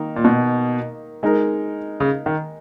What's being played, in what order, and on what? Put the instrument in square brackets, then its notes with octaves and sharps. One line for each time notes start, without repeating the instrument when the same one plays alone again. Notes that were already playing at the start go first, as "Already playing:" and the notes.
Already playing: [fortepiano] D#3 A#3 D#4 A#4
[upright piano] A#2
B2
[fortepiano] G#3 D#4 A#4
[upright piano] C#3
D#3